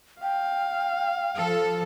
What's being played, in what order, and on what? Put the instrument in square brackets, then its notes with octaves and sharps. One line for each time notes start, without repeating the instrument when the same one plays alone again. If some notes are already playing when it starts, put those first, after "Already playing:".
[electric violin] F5 [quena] G5
[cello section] F3 A4